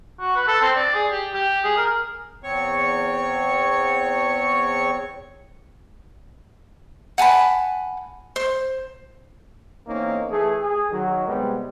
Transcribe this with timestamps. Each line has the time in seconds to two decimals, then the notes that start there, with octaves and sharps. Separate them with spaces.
0.19 F#4
0.36 B4
0.48 A4
0.61 C4
0.77 D5
0.95 G#4
1.11 G4
1.34 G4
1.64 G#4
1.77 A#4
2.44 E2 C4 C#5 C#6
7.18 F#5 G#5 A5 B5
8.36 C5
9.87 E2 A#3 C4 C#4 D#4
10.30 E3 A3 G#4
10.60 G#4
10.91 D#3 F#3
11.27 C3 G3 G#3 B3